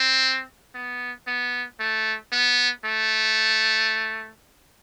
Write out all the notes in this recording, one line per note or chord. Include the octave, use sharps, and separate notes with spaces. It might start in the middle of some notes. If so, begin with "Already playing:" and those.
Already playing: C4
B3
B3
A3
B3
A3